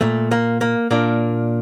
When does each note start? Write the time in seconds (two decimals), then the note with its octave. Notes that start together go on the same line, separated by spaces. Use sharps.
0.01 A#2 A3
0.31 A#3
0.61 A#3
0.91 A#2 A#3 D4